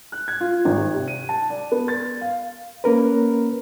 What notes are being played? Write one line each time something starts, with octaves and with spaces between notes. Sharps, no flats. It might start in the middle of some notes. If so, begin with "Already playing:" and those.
F#6
G#6
F4
G#1
G4
C3
D#7
A5
D5
B3
A6
F5
A#3 C#4 A#4 B4